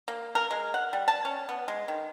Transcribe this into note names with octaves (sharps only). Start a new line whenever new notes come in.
A#3
A#4
G#3
F#5
G3
A5
C#4
B3
G#3
D#3